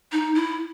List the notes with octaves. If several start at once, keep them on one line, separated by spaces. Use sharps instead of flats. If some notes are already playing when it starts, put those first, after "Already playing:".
D#4
E4